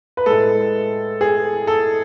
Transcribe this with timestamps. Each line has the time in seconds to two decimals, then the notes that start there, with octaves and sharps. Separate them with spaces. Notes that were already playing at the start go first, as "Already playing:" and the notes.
0.17 B4
0.26 A2 G#3 A4
1.21 G#4
1.67 A4